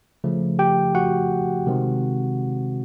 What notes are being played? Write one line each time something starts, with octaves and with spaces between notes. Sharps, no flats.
C#3 F3 A3
G4 G5
F#4 F#5
C3 D#3 G#3 C4